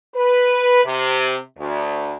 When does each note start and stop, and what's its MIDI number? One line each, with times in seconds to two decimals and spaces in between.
0.15 0.80 71
0.85 1.37 48
1.58 2.14 38